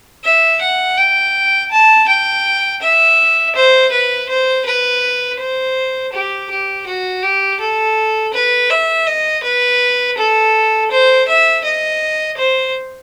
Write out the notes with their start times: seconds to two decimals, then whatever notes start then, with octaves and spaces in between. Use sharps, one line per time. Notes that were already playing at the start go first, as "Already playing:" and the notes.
0.24 E5
0.61 F#5
0.97 G5
1.71 A5
2.08 G5
2.82 E5
3.56 C5
3.92 B4
4.29 C5
4.66 B4
5.40 C5
6.13 G4
6.50 G4
6.86 F#4
7.23 G4
7.60 A4
8.34 B4
8.70 E5
9.07 D#5
9.44 B4
10.17 A4
10.91 C5
11.28 E5
11.64 D#5
12.37 C5